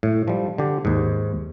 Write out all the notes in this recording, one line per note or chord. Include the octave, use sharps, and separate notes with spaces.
A2
F3 G3
D3 G4
D#2 G#2